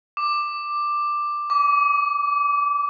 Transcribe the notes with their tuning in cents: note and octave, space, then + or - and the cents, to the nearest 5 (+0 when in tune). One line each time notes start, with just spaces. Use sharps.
D6 +10
D6 -25